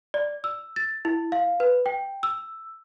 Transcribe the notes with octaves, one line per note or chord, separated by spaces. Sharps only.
D5
E6
A6
E4
F5
B4
G5
E6